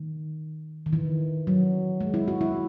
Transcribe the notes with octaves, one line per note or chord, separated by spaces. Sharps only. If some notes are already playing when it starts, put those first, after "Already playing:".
Already playing: D#3
D#3
E3
F#3
G#3
E4
F#4
E4